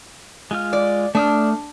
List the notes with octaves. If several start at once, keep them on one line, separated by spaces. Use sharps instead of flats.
G#3 F4 F6
D5
A3 D4 D#6 F6